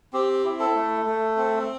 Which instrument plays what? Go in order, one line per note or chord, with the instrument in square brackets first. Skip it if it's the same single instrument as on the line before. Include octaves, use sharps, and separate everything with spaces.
[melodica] C4 G4
E4
A4
A3
A3
C4